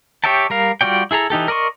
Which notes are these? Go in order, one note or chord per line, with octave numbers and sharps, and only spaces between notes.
G4 C#5 E5 G5 A5
G3 A#4 F5
G3 F4 F#4 D5 G5
E4 G#4 A4 A#5
E3 D#4 G4 A4
A#4 D5 D#5 C6 C#6